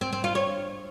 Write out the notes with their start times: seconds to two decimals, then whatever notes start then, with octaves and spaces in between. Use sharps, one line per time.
0.01 C4
0.13 C4
0.24 F4
0.35 C#5